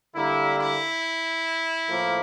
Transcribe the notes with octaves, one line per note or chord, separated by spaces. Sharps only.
D3 G3 A#3 E4
E4
A2 F3 A#3